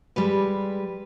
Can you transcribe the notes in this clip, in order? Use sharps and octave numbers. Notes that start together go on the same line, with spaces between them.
G3 G#3 B4